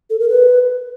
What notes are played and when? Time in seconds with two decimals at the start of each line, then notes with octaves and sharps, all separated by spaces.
0.10 A4
0.20 A#4
0.29 B4